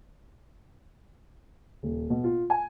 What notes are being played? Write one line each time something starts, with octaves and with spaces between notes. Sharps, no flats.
D#1
B2
F4
G#5